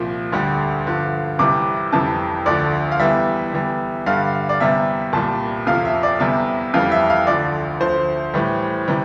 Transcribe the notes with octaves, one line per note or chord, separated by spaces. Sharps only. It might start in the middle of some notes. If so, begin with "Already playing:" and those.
Already playing: C2 A#2 F3
D2 D3 G3
G2 D3 F3
C2 C3 E3 G3 D6
F2 C3 E3 G3 A5
D2 D3 F3 D5
F5
E2 E3 G3 E5
E2 E3 G3
G2 D3 G3 F5
D5
E2 C3 G3 E5
C2 A#2 G3 A5
F2 C3 F3 F5
E5
D5
E2 C3 G3 E5
F2 E3 G3 F5
E5
F5
D2 D3 F3 D5
D2 D3 F3 C5
A2 E3 G3
C3 E3 G3